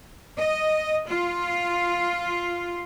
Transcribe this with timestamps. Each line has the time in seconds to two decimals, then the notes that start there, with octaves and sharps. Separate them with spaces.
0.38 D#5
1.09 F4